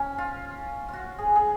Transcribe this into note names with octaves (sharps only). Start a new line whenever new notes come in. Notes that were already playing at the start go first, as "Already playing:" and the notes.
Already playing: C#4
F4
F4 F#4
G#4
G#4